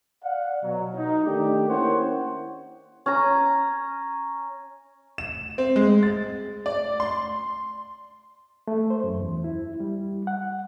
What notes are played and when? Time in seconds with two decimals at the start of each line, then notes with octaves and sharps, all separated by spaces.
0.23 D5 F5 F#5
0.64 B2 F#3
0.95 D#4
1.25 D#3 A3 D4 G4
1.68 A#3 C#4 E4 C5 C#5 F#5
3.06 C#4 A#5
5.18 E7
5.58 C4
5.76 G#3
6.03 A6
6.66 D5
7.00 C6
8.68 A3
8.90 C5
9.04 F#2
9.21 E2
9.44 E4
9.80 G3
10.27 F#5